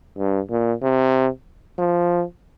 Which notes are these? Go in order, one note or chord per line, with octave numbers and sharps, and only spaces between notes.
G2
A#2
C3
F3